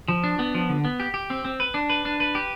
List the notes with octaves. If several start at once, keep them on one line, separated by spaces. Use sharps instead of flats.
F3
D4
B3
F3
D3
B3
G4
G4
C4
C4
B4
D4
B4
D4
B4
G4